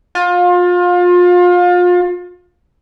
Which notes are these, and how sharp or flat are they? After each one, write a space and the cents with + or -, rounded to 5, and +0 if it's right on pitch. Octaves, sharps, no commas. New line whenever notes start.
F4 +30